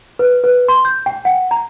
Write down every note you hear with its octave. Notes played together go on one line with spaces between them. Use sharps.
B4
B4
C6
G6
G5
F#5
A#5